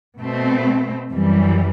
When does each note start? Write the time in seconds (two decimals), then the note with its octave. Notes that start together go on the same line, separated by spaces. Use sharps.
0.21 B2 A3 C4
1.09 F#2 E3 G3